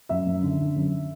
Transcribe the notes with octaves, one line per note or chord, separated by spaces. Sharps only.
F#2 E5
F#2
D3
D3
F#2